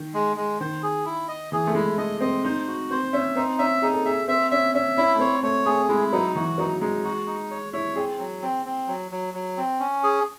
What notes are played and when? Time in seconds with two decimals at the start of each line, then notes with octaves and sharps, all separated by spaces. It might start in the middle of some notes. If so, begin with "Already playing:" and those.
Already playing: D#3
0.14 G#3
0.36 G#3
0.60 D#3 C5
0.83 G#4
1.05 E4
1.28 D#5
1.52 E3 G#4
1.67 A3
1.75 G#3 E4
1.98 A3 D#5
2.21 C4 D#5
2.45 D#4 C5
2.68 F#4
2.91 C4 C5
3.13 C#4 E5
3.36 C4 D#4
3.59 C#4 E5
3.82 D#4 G#4
3.93 A4
4.05 G#4 E5
4.28 C4 E5
4.51 C#4 E5
4.74 C#4 E5
4.97 C#4 E4
5.15 A3
5.20 C4 C#5
5.43 A3 C#5
5.66 A3 G#4
5.89 G#3 E4
6.12 F#3 D#4
6.35 E3 F#4
6.58 F#3 D#4
6.81 G#3 D#4
7.05 F#4
7.27 D#4
7.51 C#5
7.73 E4 C#5
7.96 C4 G#4
8.19 F#3
8.42 C4
8.66 C4
8.88 F#3
9.11 F#3
9.34 F#3
9.57 C4
9.80 C#4
10.04 G#4